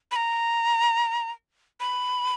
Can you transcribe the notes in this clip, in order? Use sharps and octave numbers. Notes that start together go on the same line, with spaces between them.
B5
A#5
B5